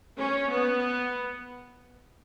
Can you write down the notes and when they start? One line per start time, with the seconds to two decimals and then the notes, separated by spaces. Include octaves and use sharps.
0.18 C#4
0.49 B3